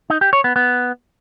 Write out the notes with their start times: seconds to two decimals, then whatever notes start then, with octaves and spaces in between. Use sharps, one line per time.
0.10 D#4
0.21 G4
0.33 C#5
0.44 B3
0.56 B3